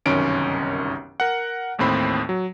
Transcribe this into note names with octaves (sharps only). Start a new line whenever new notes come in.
G1 C2 F#2 D#3 C#4 D7
A#4 F#5
A1 D#2 A2 C4 B5
F#3